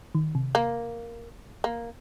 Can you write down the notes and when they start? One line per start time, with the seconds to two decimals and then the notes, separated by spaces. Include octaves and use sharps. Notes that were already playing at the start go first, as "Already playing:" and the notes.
0.15 D#3
0.35 C3
0.55 A#3
1.64 A#3